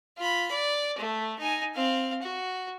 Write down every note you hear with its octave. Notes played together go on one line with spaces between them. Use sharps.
F4 B5
D5
A3
D#4 G#5
C4 F5
F#4